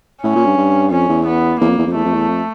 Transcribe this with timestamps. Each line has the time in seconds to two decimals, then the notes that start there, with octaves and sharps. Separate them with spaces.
0.23 A2 C#4
0.35 A#2
0.46 G2
0.57 G2
0.91 F2 C#4
1.09 E2
1.26 B3
1.60 E2 A#3
1.70 F2
1.78 E2
1.87 F2
1.94 E2 A3
2.05 F2
2.14 E2
2.29 F2